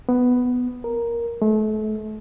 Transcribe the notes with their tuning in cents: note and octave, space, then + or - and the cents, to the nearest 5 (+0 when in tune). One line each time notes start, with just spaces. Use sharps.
B3 +5
A#4 +5
A3 -35